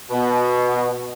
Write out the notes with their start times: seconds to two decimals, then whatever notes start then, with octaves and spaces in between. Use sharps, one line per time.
0.11 B2